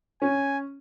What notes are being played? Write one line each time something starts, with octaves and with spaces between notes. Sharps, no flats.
C#4 G#5